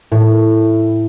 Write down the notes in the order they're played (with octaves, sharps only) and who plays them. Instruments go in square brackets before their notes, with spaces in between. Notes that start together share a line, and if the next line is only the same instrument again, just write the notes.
[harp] A2